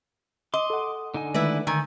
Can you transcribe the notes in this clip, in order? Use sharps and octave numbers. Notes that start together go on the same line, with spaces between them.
D#5 C6 D6
A4 F#5
D3 D#4 G#5
D#3 G#3 A3 E4 B4 D5
D3 D#3 G#5 A#5 E6